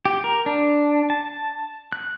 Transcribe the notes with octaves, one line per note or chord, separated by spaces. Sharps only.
G4
A#4
D4
A5
F#6